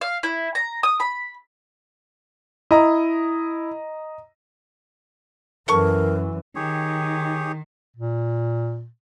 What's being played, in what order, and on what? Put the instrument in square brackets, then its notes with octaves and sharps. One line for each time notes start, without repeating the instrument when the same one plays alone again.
[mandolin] F5
E4
A#5
D#6
B5
[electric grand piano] E4 D#6 [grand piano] D#5 A#5
[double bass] F#2 E3 [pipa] A4 C#6 [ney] A#4
[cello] D#3 [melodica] G4 G#4 C#5
[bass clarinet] A#2